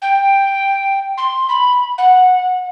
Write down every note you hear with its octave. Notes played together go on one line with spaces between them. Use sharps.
G5
C6
B5
F#5